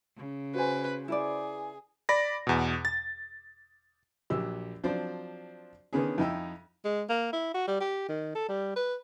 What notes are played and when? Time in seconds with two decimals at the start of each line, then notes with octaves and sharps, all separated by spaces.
0.17 C#3
0.55 F#4 B4 C5 G#5
1.08 E4 G#4 B4 D5
2.09 D5 B5 A#6
2.47 E2 B2
2.85 A6
4.30 A#1 F#3 G4 E6
4.84 F3 F#3 C4 D4 C5 D5
5.93 D3 D#3 B3 C#4 G#4
6.18 F2 D#4 E4 G5 E6
6.85 G#3
7.10 A#3
7.33 E4
7.54 F#4
7.68 G3
7.80 G4
8.09 D#3
8.35 A4
8.49 G3
8.76 B4